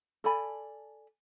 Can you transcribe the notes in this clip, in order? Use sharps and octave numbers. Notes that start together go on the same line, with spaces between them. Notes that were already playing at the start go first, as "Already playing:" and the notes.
A4 D5 G#5 B5